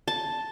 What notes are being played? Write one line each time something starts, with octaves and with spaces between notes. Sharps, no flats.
A5